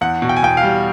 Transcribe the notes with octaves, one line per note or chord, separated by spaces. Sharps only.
E2 F#5
B2
G5
G#5
E2 G5
F5
G3